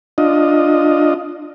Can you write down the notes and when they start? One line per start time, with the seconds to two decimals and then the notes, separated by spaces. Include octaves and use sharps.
0.18 D4 F4 D#5